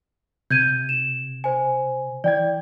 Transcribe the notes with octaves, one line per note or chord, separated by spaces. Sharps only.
C3 G6 G#6 D#7
E7
C5 G#5
E3 D5 G5 G#6